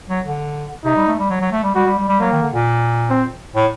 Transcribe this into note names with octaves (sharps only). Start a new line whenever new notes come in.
F#3
D3
C3 D#4
G3
A3
G3
F#3
F#3
A3
G3
G3 F#4
G3
G3
G3
F#3 A#3
D#3
D3
A#2
C4
A2